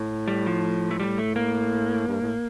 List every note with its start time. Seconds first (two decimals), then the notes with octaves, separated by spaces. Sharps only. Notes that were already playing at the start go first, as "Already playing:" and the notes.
Already playing: A2
0.28 G3
0.46 F3
0.91 A3
1.00 A2 G3
1.18 A3
1.36 A#3
2.07 G2
2.21 A2